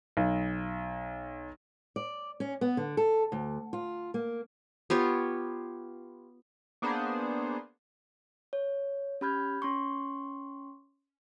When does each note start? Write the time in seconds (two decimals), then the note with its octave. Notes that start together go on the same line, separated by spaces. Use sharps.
0.17 B1
1.96 D5
2.40 C#4
2.61 B3
2.77 D3
2.97 A4
3.32 D2
3.73 F4
4.14 A#3
4.90 B3 F4 G4 C#5
6.82 A#3 B3 D4 G#4 C5
8.53 C#5
9.21 C#4 G4 B5 F6 G6 G#6
9.62 C#4 C6 C#6